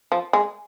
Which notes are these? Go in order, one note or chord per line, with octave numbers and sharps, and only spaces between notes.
F3
G#3